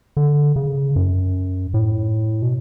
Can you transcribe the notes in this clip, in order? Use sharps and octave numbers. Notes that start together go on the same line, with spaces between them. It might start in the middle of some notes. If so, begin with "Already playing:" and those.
D3
C#3
F#2
A2
B2